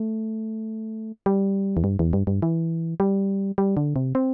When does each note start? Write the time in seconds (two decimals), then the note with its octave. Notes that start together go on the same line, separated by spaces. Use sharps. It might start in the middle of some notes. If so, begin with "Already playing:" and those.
Already playing: A3
1.26 G3
1.77 E2
1.84 G2
1.99 E2
2.13 G2
2.27 G2
2.42 E3
3.00 G3
3.58 G3
3.77 D3
3.96 C3
4.15 C4